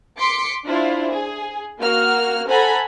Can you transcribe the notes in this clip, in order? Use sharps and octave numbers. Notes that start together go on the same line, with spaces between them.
C6 D6 B6 C#7
D4 E4 F4 C5
G#4
A#3 F#4 F6
A4 C5 F#5 G#5 A#5 B5